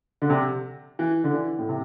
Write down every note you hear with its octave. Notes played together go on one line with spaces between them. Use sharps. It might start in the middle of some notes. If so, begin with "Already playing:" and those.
D3
C3
E3
D3
E3
A2
C3